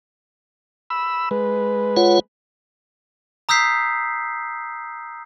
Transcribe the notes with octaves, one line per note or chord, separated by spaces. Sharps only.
B5 E6
G#3 B4
F4 C#5 F#5
A#5 D#6 E6 G6 B6 C7